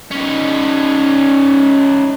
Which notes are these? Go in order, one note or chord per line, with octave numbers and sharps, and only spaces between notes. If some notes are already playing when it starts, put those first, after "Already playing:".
C#4 D#4